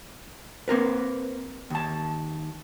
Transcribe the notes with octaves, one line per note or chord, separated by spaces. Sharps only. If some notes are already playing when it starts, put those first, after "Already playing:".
A#3 C4 A#4 B4
D#2 A5